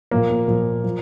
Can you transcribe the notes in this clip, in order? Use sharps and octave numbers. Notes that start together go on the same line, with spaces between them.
A#2 F3 A#3
A#3
A#2 F3
F3